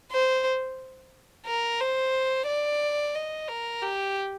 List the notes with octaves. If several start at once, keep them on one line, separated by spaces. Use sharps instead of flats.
C5
A#4
C5
D5
D#5
A#4
G4